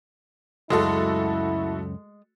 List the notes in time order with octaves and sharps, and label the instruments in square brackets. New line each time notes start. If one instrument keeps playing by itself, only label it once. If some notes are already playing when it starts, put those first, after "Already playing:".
[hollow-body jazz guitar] C#2 F#2 [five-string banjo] G#3 [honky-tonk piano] A3 F#4 A4 [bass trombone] E4